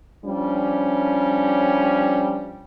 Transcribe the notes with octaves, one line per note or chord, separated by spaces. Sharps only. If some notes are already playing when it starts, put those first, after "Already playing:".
F3 G3 C#4 D4